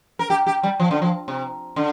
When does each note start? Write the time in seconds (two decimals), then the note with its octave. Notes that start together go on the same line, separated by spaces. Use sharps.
0.19 A#4
0.30 G4
0.47 G4
0.63 G3
0.80 F3
0.91 D3
1.02 F3
1.28 C3
1.76 D3